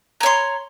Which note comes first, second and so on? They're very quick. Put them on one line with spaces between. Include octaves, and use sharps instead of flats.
A#5 C#5 C6